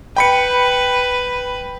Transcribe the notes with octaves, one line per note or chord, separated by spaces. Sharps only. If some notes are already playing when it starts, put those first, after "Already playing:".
B4 G5 B5 C#7